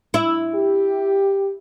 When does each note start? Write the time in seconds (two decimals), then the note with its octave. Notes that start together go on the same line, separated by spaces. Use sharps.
0.14 E4
0.54 G4